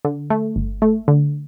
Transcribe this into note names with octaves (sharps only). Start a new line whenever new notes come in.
D3
A3
G1
A3
D3